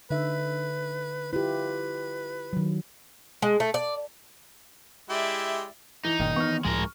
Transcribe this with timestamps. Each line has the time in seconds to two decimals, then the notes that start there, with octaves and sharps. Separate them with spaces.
0.10 D3 D#4 B4 E5
1.33 E4 F4 G4 B4
2.53 D#3 F#3
3.42 G#3
3.60 A3
3.74 D5
5.10 G#3 E4 G4 D5 E5
6.05 E3 D#4
6.20 F#1 A#2 D#3
6.36 D#3 E3 B3 C#6 F6
6.65 C#2 A2 F3 G#3 A#4